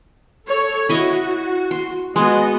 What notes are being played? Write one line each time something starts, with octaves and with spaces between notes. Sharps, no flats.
A4 C#5
E4 F#4 D#5 C#6
C6
G#3 B3 F#4 D#5